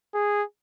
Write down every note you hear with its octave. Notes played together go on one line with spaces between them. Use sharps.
G#4